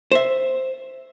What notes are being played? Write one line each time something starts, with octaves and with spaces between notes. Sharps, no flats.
C5 E5